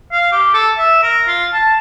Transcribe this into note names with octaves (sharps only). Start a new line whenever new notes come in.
F5
G4
A4
E5
A#4
F4
A5